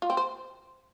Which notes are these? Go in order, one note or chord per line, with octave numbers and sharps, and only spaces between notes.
F4
C4
C5